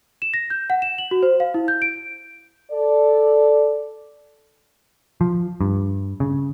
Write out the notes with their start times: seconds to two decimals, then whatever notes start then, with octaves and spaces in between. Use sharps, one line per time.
0.22 E7
0.34 A#6
0.50 G6
0.70 F#5
0.82 E7
0.98 F#7
1.11 F#4
1.23 C5
1.40 F5
1.54 E4
1.68 G6
1.82 D7
2.72 A4 D5
5.21 F3
5.61 G2
6.20 C#3